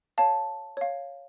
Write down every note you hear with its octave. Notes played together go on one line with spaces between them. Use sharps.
C#5 F5 A5
C#5 F5